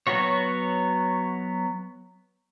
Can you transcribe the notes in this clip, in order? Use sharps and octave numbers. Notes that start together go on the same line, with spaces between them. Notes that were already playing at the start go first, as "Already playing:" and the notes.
F#3 B3 F#4 C#5